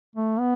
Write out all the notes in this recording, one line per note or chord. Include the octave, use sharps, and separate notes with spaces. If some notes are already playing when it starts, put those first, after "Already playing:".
A3
B3